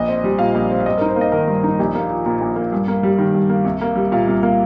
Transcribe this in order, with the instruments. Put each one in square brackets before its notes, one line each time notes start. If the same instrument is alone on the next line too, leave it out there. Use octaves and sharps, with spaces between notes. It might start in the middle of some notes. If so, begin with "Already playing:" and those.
Already playing: [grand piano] A#1 D#5
C4
G3
A#2 F5
A#1
C4
F5
G2 D#5
A#4
D#4
C5
A#3
D#5
D#3 A#4
G2
D#4
A#1 G4
A#3
F3
A#2 A#4
A#1
A#3
G2
A#3
G3
D#3
G2
A#3
C2
A#3
G3
A#2 F5
C2
A#3